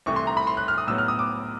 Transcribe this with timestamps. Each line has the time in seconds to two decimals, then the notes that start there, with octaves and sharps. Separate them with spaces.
0.06 C2 C3 E3 A3 C#6
0.16 C6
0.27 A#5
0.37 B5
0.47 C6
0.57 F#6
0.68 F6
0.78 D#6
0.88 A2 F#3 B3 E6
0.98 F6
1.08 D#6
1.19 D6